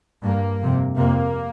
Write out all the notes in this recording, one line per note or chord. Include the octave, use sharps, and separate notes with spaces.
G2 A#3
F2 C3
F2 C3 A#3